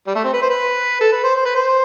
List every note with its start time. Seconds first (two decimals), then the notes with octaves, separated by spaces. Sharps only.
0.07 G3
0.15 A3
0.24 C4
0.33 B4
0.42 C5
0.49 B4
1.01 A4
1.12 B4
1.24 C5
1.36 C5
1.45 B4
1.55 C5